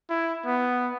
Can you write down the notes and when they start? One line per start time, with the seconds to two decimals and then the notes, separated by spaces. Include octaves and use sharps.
0.10 E4
0.46 B3